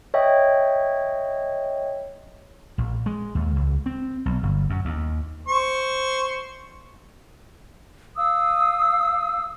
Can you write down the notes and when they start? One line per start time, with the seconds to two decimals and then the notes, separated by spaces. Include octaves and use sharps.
0.14 C#5 D#5 E5 G5
2.78 A#1
3.06 G#3
3.35 D#2
3.56 C#2
3.86 C4
4.26 B1
4.43 G1
4.70 F#2
4.85 D#2
5.48 C5 C#6
8.17 F5 D#6 E6